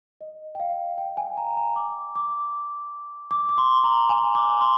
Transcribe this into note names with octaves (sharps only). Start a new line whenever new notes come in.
D#5
G5
F5
G5
G#5
A#5
A#5
D6
D6
D6
D6
C6
A#5
G#5
D6
C6